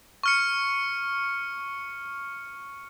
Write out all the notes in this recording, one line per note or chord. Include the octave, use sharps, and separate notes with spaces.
C#6 F6 C#7